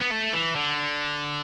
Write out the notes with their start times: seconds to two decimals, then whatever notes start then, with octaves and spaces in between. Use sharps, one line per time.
0.02 B3
0.11 A3
0.33 E3
0.55 D3